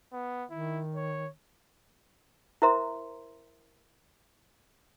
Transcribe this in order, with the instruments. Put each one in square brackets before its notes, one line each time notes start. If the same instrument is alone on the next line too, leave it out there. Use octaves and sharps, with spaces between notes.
[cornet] B3
[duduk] D#3 [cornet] E4
[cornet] C#5
[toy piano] E4 A#4 C5 E5 A#5 C6